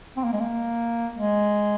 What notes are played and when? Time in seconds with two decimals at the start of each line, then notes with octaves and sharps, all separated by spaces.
0.17 C4
0.24 A#3
0.33 G#3
0.41 A#3
1.17 G#3